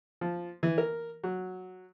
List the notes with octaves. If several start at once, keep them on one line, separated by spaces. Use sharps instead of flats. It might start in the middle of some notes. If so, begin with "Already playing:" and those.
F3
E3
A#4
F#3